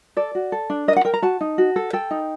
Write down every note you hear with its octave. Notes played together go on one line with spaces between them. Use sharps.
A4 D5
F#4
A4
D4
A#4 D#5
F#5
A#4 G5
A#5
F#4 A5
D#4
F#4
A4
A4 G5
D#4